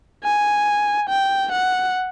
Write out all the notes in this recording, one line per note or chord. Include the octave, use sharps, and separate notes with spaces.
G#5
G5
F#5